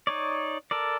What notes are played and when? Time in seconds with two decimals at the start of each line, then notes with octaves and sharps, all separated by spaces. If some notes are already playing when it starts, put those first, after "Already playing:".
0.07 D#4 C#5 D5
0.71 A4 A#4 D5